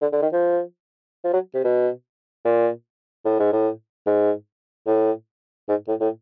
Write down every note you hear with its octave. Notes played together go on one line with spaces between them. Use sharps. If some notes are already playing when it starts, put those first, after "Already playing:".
D3
D3
D#3
F3
F3
F#3
C3
B2
A#2
A2
G#2
A2
G#2
A2
G#2
A2
A2